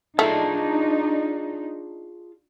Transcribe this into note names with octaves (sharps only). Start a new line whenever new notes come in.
A3 D4 D#4 F4 G#4 A5